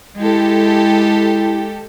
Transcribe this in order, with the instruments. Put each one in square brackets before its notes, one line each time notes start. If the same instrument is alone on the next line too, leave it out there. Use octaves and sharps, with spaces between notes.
[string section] G#3 G4 A4 [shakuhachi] E4